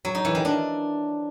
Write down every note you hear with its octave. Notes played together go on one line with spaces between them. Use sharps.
F#3
D#4
E3
D#3
D4